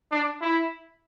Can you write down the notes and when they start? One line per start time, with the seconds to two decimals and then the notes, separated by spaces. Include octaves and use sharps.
0.11 D4
0.41 E4